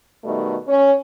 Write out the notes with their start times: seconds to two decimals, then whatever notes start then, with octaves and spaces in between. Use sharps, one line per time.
0.24 B2 D#3 G3 A3
0.68 C#4